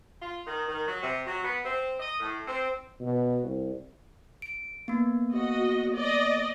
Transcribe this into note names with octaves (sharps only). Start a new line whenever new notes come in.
F4
D#3
D#3
F#3
C3
F#3
B3
C4
D#5
A2
C4
B2
C2
D7
A#3 B3
F#4 D#5
D5 D#5